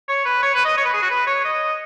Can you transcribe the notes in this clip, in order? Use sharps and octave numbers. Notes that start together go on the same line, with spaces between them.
C#5
B4
C#5
B4
D#5
C#5
B4
G#4
F#4
B4
C#5
D#5